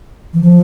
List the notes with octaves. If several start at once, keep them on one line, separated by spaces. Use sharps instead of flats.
E3
F3